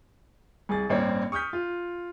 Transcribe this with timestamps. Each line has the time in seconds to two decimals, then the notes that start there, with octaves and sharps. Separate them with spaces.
0.69 C2 G#4 A6
0.90 A1 G2 A#3 C4 C#5 D5
1.32 C#6 D#6 F6 G6 B6
1.53 F4